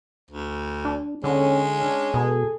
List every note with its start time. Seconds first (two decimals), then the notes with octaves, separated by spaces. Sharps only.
0.31 D2
0.85 D4
1.24 D#2 D3 G#3 C#4
1.78 C#4 D4
2.14 B2 G#4 A4